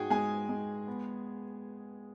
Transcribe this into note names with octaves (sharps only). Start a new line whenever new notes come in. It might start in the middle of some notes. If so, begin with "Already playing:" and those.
Already playing: G#2 F#4 G#4 G5 G#5
G#3 G#4 G#5
G#3
B3